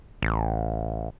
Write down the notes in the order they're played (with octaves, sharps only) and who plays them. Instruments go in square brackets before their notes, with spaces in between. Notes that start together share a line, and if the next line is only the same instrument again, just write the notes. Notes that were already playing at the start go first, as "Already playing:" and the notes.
[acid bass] A1